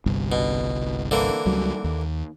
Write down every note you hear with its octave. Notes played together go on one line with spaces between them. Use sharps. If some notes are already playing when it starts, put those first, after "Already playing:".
G1 C2 G2
B2
D3 E3 A#3
C#2 F#3 G3
D#2